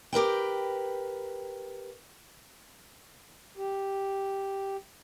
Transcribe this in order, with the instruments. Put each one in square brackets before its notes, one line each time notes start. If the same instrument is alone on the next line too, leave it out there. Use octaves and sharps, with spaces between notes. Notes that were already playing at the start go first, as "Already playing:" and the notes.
[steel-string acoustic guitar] G4 A#4 B4 G5
[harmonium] G4